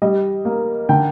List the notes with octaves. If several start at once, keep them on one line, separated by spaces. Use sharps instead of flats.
G3 D#5
A#3
D3 G5